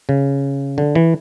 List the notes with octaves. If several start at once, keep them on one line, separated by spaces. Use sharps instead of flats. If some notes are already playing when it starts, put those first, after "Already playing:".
C#3
D3
E3